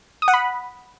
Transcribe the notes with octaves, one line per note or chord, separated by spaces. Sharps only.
D#6
F#5
B5